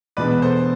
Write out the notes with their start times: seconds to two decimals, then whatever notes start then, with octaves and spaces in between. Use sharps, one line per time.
0.17 E2 B2 G#3 B3 D4 B4 D5
0.42 A4 C5